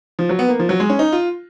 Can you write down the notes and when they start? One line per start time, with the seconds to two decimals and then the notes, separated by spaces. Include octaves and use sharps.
0.19 F3
0.29 F#3
0.39 B3
0.49 A#3
0.59 F3
0.69 F#3
0.80 G#3
0.90 C#4
0.99 D#4
1.12 F4